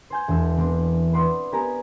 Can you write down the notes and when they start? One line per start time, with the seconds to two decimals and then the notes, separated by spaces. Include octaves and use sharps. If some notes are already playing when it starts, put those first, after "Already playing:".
0.10 C5 G#5 G6
0.28 E1 E2 G4 E6
0.57 E3 B3 C4 D4
1.13 B4 C5 D5 F#5 C6 D#6
1.52 B3 G4 A#4 G#5 A#5